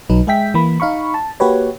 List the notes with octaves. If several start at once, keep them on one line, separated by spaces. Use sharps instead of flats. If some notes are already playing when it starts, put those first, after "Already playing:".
B1 F#3 D#4 B4
G#3 G#4 E5 G5 B6
E3 A#3 B5
D#4 F5 B5 C#6
A5
A#3 F#4 G4 B4 C#5